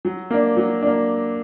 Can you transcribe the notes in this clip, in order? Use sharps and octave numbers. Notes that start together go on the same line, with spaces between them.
F#3
A#3 D4
F#3
A#3 D4